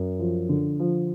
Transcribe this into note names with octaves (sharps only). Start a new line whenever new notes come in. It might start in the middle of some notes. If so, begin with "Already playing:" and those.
Already playing: F#2
F3
D3
F3